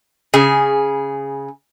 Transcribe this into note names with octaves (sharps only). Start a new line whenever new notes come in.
C#3 G#4